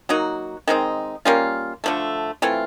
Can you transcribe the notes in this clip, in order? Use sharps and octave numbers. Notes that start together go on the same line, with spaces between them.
F#3 A#3 D#4 F#4
D#3 G#3 C4 D#4
G3 A#3 C#4 F4
D3 F3 A3
E3 A3 C4 F4